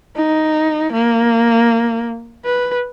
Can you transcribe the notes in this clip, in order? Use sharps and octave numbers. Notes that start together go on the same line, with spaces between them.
D#4
A#3
B4